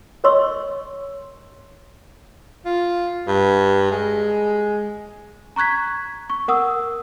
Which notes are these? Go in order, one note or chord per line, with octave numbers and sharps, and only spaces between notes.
A#4 C#5 D#5 C6 C#6 E6
F4
G2
G#3
A#5 C#6 F#6 G#6 B6
C#6
A#4 F#5 D#6 E6